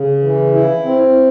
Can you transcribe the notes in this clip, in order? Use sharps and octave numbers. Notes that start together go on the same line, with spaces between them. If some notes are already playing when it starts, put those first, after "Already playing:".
Already playing: C#3
E3
E4
C4